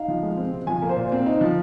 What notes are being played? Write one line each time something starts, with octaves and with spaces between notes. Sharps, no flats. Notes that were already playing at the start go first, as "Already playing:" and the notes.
Already playing: D#4 F5
F3
G#3
C4
C3
F3 G#5
A#3
C5
A#2
C4
D#4
F3